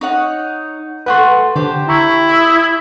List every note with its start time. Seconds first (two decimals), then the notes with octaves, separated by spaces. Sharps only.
0.01 D#4 C#5 F#5
1.06 A3 B3 F#4 B4 F#5 C6
1.56 D3 G4 C5 A5
1.89 E4 A#5 C#6
2.29 E5 D#6